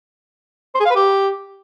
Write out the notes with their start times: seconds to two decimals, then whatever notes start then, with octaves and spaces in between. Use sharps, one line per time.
0.75 C5
0.80 G#4
0.85 F5
0.90 B4
0.96 G4